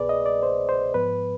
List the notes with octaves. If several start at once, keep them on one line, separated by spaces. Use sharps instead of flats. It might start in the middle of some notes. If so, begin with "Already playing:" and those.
Already playing: C2 B2 B3 G#4 B4 D5
D#5
D5
C5
C5
G#2 F3 B3 B4